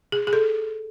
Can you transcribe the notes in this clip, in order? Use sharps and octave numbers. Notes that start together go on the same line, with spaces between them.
G#4
G#4
A4